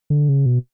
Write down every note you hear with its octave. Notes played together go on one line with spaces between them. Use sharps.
D3
C#3
B2